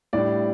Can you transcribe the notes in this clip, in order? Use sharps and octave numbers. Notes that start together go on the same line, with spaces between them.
A2 G3 D4 D5